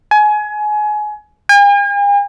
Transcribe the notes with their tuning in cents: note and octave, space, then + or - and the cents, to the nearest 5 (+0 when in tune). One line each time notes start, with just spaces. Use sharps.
G#5 +25
G#5 -45